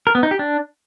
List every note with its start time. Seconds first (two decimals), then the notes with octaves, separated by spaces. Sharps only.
0.07 A#4
0.15 B3
0.23 D#4
0.31 G4
0.39 D4